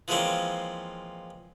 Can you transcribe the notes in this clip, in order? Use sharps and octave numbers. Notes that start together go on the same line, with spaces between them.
E3 F3 G#3 A#3 C4 C#4